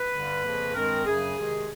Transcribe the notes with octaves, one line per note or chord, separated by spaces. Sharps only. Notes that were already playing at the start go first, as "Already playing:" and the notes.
Already playing: B4
G2 D3 G3
F2 C#3 F3 A#3
G2 D#3 G#3 C4 A#4
F#2 C#3 F#3 G#4
C3 D#3 G#3